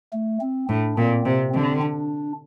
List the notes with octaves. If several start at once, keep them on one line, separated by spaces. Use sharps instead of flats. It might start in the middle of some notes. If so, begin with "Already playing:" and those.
A3
C4
A2 D4
A#2 C4
C3 C4
D3 C4
D4